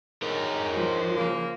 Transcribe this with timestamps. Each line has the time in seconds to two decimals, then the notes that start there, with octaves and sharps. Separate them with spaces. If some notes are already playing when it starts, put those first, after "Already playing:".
0.22 G#2 D#3 A#4 C#5
0.73 F3
1.16 C#3 A#3